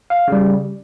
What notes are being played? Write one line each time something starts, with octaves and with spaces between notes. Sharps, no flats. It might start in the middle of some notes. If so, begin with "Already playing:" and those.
F5
C#3 G3